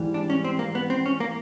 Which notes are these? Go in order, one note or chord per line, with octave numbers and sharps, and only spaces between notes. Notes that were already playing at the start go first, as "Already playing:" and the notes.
Already playing: G#2 E3 G3
D4
C#4
C4
A#3
B3
C4
C#4
A#3